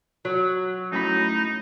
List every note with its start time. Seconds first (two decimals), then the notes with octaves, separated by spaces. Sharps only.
0.25 F#3
0.92 F#2 A2 D#4 B5